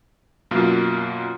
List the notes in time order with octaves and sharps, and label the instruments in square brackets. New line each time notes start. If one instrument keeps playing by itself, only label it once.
[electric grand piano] F#2 B2 A#3 F4